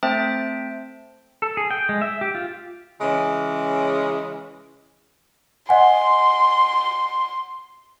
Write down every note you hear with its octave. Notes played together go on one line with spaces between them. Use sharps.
A3 C4 C5 E5 G5 A5
A4
G#4
G5
G#3
E5
G4
F4
C#3 E3 G#3 C#4
D#5 F#5 G#5 C6